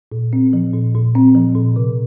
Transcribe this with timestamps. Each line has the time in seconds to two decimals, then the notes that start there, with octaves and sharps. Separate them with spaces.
0.12 A#2
0.33 C4
0.53 F3
0.74 A#2
0.95 A#2
1.15 C4
1.35 F3
1.55 A#2
1.76 C3